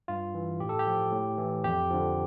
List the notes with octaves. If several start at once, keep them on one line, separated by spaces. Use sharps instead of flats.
G2 F4
E3
A2 G4
A4
G4
F3
A2
E3
F2 G4
D3 F3